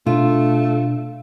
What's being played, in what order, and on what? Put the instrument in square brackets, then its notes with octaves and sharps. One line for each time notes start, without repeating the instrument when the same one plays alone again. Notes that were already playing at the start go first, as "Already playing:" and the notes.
[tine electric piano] B2 D4 [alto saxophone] A3 [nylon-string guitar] F4